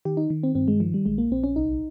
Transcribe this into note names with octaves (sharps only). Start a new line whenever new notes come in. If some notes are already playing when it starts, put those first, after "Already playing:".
D#3 G4
D#4
D#3
C4
G2 C4
G#3
D#3 F3
G3
A#1 G#3
A#3
A#1 C4
C#4
C2 D#4